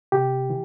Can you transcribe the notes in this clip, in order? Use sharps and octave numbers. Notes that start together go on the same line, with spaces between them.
C3 G4
E3